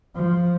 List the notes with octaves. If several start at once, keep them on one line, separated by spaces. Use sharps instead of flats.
F3